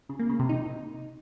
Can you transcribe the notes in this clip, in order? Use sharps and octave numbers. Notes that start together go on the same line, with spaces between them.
C#3
A#3
C#3
C3
D#4